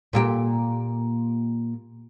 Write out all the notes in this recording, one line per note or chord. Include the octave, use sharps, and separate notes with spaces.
A#2 A#3 G4